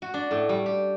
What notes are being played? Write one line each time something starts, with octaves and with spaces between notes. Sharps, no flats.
F#4
D4
A2
G3
G4